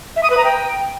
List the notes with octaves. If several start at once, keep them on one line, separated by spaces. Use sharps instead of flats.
E5
D#6
B4
A#5
G5